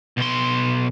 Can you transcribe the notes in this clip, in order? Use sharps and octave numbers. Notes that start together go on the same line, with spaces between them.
B1 C6